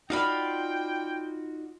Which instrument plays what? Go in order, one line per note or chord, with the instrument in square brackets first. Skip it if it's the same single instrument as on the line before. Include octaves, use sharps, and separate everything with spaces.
[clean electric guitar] D#4 F#4 D5 [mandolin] F4 F5 B5 [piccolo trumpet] G5